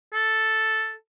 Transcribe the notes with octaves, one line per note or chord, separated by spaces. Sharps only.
A4